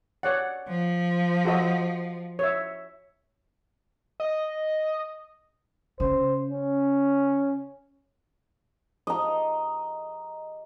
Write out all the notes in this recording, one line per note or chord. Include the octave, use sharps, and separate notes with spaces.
C#5 D5 F#5
F3
F#4 A4 D#5
C#5 E5
D#5
C#3 C5
C#4
D#5 A#5